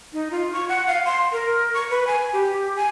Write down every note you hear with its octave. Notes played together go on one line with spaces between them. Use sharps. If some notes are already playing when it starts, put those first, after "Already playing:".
D#4
F4
C#6
F#5
F5
C6
A#4
C#6
B4
G#5
G4
G#5